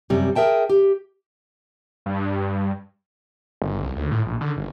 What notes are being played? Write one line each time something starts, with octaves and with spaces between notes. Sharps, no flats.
F#2 C3 G3
G#4 A#4 E5 G5 A5
G4
G2
G1
C2
D2
A2
A#1
D3
G1